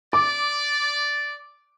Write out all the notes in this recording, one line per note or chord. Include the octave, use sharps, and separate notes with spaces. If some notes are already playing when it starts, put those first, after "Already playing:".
D5 D6